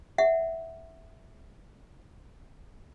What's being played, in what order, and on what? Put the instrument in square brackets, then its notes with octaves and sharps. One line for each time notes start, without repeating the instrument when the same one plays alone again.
[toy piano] E5 F#5